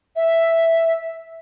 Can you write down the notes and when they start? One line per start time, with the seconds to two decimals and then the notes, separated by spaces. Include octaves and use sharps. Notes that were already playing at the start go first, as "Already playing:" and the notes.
0.16 E5